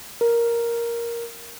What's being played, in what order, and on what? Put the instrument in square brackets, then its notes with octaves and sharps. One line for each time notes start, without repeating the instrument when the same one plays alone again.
[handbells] A#4